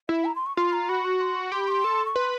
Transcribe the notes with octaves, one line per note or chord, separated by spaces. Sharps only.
E4 E5
A#5
C6
C#6
F4 C6
A#5
F#4 B5
C#6
C6
G4 C6
B5
C#6
C6
A4
C#6
B4 C6